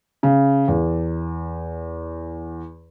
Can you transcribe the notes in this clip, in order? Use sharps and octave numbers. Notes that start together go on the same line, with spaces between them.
C#3
E2